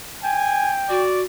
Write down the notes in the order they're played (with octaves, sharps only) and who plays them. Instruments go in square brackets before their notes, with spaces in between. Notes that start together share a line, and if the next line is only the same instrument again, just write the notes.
[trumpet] G5 [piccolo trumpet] G#5
[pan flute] F#4 [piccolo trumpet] D5